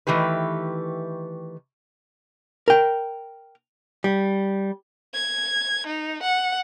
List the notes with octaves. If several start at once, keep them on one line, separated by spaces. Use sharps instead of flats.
D#3 E3 A3 G4 B4
A#4 G5
G3
G#6
D#4
F#5